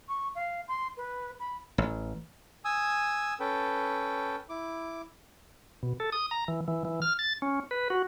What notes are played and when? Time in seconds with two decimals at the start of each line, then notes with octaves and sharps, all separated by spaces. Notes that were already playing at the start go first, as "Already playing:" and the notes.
0.08 C#6
0.35 F5
0.68 C6
0.97 B4
1.39 B5
1.78 A1
2.65 G#5 D#6 E6
3.40 C#4 A4 B4 G5
4.49 E4 D6
5.83 B2
6.00 A4
6.12 D#6
6.31 A#5
6.48 E3
6.68 E3
6.85 E3
7.02 F6
7.19 A6
7.42 C#4
7.71 B4
7.90 F#4